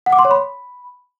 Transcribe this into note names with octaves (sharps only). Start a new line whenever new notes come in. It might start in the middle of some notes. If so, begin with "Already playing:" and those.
F#5
D6
C6
C#5
B5